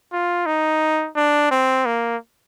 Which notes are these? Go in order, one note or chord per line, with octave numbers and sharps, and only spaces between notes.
F4
D#4
D4
C4
A#3